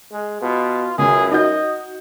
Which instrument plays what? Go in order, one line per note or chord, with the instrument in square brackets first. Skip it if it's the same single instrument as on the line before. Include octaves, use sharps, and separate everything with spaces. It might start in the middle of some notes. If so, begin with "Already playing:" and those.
[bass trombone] G#3
[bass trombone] B2 [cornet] F4
[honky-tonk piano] C#2 [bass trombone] F#2 [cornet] G#4
[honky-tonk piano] D#4 F#4 G6 [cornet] D#5